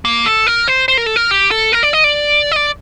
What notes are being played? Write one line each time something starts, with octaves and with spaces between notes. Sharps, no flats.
A#3
A4
A#4
C5
C5
A#4
A4
A#4
G4
A4
A#4
D5
D#5
D5
D#5
D5